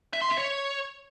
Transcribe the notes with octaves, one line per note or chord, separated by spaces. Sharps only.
E5
C6
E5
C#5